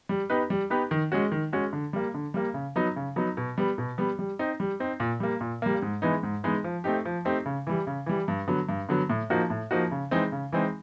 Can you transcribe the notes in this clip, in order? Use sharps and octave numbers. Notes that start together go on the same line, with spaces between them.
G3
B3 D#4 G4 B4
G3
B3 D#4 G4 B4
D#3
G#3 C#4 F#4
D#3
G#3 C#4 F#4
D3
G3 A#3
D3
G3 A#3
C#3
F#3 B3 D#4
C#3
F#3 B3 D#4
B2
G3 B3
B2
G3 B3
G3
C4 D#4
G3
C4 D#4
A#2
G3 A#3
A#2
G3 A#3
G#2
E3 G#3 B3 D#4
G#2
E3 G#3 B3 D#4
F3
A3 C4 D#4 G4
F3
A3 C4 D#4 G4
C#3
E3 G3
C#3
E3 G3
G2
D3 F#3 B3
G2
D3 F#3 B3
A2
F3 A#3 D#4 F#4
A2
F3 A#3 D#4 F#4
C#3
E3 G#3 C4 D#4
C#3
E3 G#3 C4 D#4